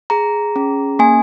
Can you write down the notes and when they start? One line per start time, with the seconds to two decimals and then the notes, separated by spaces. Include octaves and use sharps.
0.10 G#4 A#5
0.56 C#4
0.99 A#3 G#5